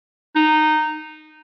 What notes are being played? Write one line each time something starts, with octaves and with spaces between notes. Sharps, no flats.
D#4